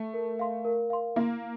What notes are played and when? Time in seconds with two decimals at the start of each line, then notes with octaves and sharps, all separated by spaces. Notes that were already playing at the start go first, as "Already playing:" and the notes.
Already playing: A3
0.14 A#4
0.39 F5 C6
0.65 A#4
0.90 F5 C6
1.16 A#3 E4